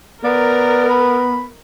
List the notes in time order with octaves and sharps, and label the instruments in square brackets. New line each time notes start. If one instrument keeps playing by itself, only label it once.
[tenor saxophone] B3 [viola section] A#4 [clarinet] D5
[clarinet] B5